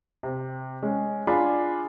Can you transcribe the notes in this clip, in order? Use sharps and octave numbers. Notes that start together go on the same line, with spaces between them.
C3
G#3 C#4
D4 F4 G#4 B5